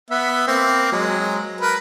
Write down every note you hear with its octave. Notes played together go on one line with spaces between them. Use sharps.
B3 E5
A#3 C4
F#3 G#3
A#4 B4